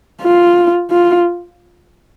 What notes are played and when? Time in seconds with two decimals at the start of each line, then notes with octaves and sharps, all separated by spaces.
0.21 F4
0.91 F4